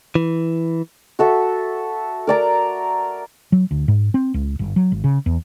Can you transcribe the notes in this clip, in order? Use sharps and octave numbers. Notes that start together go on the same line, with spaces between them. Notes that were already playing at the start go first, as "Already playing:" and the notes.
E3
F#4 A4 E5
A#4 D5 A#5
F#3
D2
G#2
C4
C#2
G1
F#3
G#1
C#3
E2